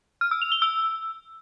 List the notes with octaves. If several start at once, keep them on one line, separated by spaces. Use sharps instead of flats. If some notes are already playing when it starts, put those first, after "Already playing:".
F6
E6
F7
G7
E6